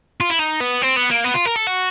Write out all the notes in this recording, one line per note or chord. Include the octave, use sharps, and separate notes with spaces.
F4
E4
D#4
B3
C4
B3
A#3
B3
F4
A#4
A4
F#4